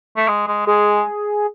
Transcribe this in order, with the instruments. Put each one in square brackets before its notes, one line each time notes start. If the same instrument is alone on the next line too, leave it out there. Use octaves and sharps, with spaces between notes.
[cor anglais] A3
G#3
G#3
[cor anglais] G#3 [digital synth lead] G#4